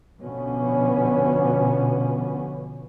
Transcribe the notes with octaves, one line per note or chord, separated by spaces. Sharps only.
B2 D3 F3 B3 C#4